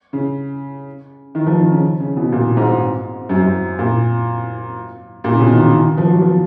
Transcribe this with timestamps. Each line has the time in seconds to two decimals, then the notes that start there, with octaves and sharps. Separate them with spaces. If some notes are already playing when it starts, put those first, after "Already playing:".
0.13 C#3
1.35 D#3
1.47 F3
1.59 D#3
1.72 C#3
2.00 C#3
2.16 B2
2.32 A#2
2.57 G#2
3.29 F#2
3.42 F#2
3.79 A#2
5.24 A#2
5.35 C#3
5.40 B2
5.52 D#3
5.57 C#3
5.73 D#3
5.97 F3
6.10 F#3
6.22 F3